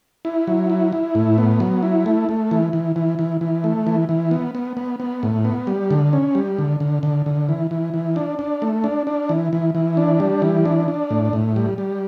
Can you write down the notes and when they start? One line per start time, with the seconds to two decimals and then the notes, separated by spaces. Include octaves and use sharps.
0.25 E4
0.47 F#3
0.70 E4
0.93 E4
1.15 A2
1.38 B3
1.60 F#3
1.83 E4
2.06 A3
2.29 A3
2.51 E3
2.73 E3
2.96 E3
3.19 E3
3.41 E3
3.64 A3
3.87 E3
4.09 E3
4.31 B3
4.55 B3
4.77 B3
5.00 B3
5.23 A2
5.45 B3
5.67 G3
5.91 D3
6.13 C#4
6.35 G3
6.59 D3
6.80 D3
7.03 D3
7.26 D3
7.49 E3
7.71 E3
7.94 E3
8.16 D4
8.39 D4
8.62 A3
8.84 D4
9.07 D4
9.29 E3
9.53 E3
9.75 E3
9.97 D4
10.20 G3
10.42 E3
10.65 D4
10.88 D4
11.11 A2
11.33 A2
11.56 G3
11.78 G3